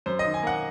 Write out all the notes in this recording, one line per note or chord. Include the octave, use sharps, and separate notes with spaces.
F#2 C5
D#5
D#3
G#5
A#3 F#5